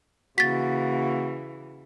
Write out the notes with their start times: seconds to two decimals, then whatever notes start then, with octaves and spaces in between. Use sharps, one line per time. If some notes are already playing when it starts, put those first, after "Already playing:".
0.38 C#3 E3 A#3 F#4 A6 B6